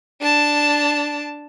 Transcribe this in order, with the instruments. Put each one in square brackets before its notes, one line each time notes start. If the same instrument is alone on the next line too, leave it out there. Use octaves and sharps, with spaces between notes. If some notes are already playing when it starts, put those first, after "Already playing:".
[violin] D4 A5